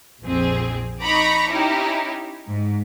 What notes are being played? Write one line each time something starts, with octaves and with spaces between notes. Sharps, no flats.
A#1 F2 C4 G#4
D#4 A#5 B5 C#6 D6
C#4 D#4 E4 G4
G#2